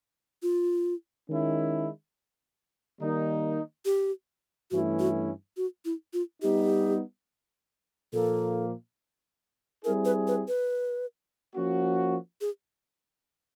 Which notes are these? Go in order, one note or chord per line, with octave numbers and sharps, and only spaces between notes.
F4
D#3 G#3 C#4 E4
D#3 G3 A#3 D#4
G4
G2 E3 A3 C#4 E4 F#4
F#4
F#4
E4
F4
G3 B3 D#4 G4
A#2 F3 A#3 A4
G3 C4 E4 G#4 A#4
B4
B4
B4
F3 A#3 C#4 F#4
G#4